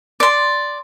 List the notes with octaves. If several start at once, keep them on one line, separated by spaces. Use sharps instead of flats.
D5 C6